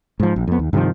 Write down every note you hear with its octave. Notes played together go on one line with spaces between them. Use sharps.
G#2 F3
A#1
F2 B3
D#2
G2 C3 D#3 F3